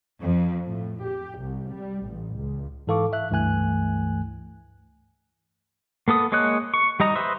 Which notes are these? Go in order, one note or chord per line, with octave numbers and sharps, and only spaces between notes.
F2
A2
G4
C2
G3
A1
C#2
G#2 E3 A4 F5 C#6 D6
E5 F#6
C#2 G2 E3 A3 G#5 F#6
A#3 B3 A4 D#6
G#3 A#3 C#5 D#5 F#6
C#6
G3 D#4 D#5 A#5
B4 C5 D#5 E5